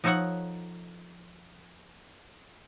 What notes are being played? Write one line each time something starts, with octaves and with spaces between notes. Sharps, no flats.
F3 D#4 A4 C#5 F#5